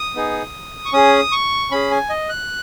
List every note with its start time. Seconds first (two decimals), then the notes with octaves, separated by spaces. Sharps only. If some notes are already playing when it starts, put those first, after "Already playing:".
Already playing: D#6
0.15 B3 D#4 G#4
0.85 C#6
0.93 C#4 G#4 D#6
1.32 C#6
1.71 C#4 G#4 B5
1.91 G#5
2.10 D#5
2.29 F#6